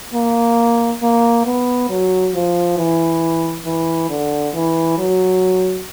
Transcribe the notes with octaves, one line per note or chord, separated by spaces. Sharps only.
A#3
A#3
B3
F#3
F3
E3
E3
D3
E3
F#3